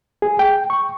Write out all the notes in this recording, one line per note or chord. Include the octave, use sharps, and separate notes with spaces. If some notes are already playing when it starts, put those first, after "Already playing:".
G#4
G5
C#6